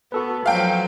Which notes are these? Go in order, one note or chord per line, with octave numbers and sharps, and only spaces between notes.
B3 F#4 A4 B4
F3 F#3 F5 G5